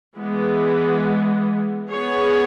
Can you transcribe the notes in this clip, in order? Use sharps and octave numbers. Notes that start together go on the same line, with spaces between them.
E3 G#3 B3
B3 G#4 C#5